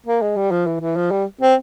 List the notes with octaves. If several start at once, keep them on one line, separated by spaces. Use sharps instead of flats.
A#3
G#3
G3
F3
E3
E3
F3
G3
C4